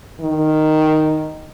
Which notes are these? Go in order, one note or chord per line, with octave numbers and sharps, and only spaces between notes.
D#3